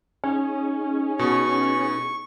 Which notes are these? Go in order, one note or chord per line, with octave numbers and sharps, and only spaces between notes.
C#4 D#4 G#4
B2 B3 C#6